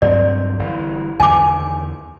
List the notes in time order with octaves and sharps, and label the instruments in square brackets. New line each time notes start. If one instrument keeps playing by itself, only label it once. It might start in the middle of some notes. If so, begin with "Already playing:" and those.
[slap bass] G2 F#3 C4 [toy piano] D5
[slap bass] G1 E3
[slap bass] E2 D3 D#3 [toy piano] G#5 D6